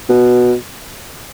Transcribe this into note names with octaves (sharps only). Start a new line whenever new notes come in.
B2